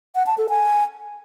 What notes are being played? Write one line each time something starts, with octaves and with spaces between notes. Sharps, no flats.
F#5
A5
A4
G#5